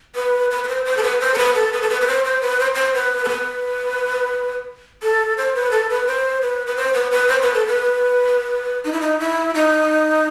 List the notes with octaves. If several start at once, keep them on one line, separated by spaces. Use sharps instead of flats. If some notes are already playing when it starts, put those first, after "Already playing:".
B4
B4
B4
C5
C5
A4
B4
C5
A4
B4
A4
B4
A4
B4
B4
C5
C5
B4
C5
C5
B4
A4
B4
A4
C5
B4
A4
B4
C5
B4
B4
C5
B4
B4
C5
B4
A4
B4
D#4
E4
D#4
E4
D#4